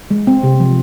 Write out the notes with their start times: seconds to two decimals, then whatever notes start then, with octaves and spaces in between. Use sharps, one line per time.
0.11 G#3
0.27 C4
0.43 C3
0.60 F3